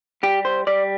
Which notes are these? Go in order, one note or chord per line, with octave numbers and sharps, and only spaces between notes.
G3 G4
C5
G3 D5